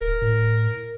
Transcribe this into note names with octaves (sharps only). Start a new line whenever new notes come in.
D1 A#4
A2